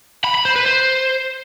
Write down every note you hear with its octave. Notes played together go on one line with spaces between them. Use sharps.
B5
B5
C5
B4
C5